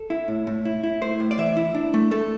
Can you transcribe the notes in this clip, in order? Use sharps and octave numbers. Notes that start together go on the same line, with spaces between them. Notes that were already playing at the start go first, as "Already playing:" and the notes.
Already playing: A4
E4
A2
A2
E4
E4
A3 C5
A2
D5
E3 E5
E4
D4
A3
A3 A4